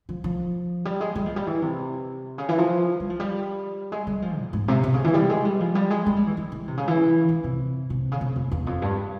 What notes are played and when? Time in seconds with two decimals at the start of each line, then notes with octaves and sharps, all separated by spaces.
0.09 F3
0.24 F3
0.85 G3
1.00 G#3
1.15 G3
1.26 F3
1.36 G3
1.47 E3
1.62 C3
2.38 C#3
2.49 E3
2.58 F3
3.00 G3
3.10 F3
3.20 G3
3.92 G#3
4.07 G3
4.22 F3
4.37 A#2
4.53 G#2
4.68 C3
4.84 C3
4.94 C#3
5.04 E3
5.14 G3
5.30 G#3
5.45 G3
5.60 F3
5.75 G3
5.90 G#3
6.06 G#3
6.16 G3
6.27 E3
6.37 E3
6.52 E3
6.67 C3
6.77 C#3
6.88 E3
7.29 E3
7.44 C3
7.90 C3
8.12 C#3
8.21 C3
8.36 F2
8.52 E2
8.67 F2
8.82 G2